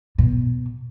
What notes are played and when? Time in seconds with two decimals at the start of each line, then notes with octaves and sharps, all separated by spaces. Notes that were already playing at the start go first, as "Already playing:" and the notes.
0.18 B2